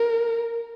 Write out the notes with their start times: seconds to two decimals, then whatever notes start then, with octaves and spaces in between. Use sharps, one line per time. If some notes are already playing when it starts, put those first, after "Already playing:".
Already playing: A#4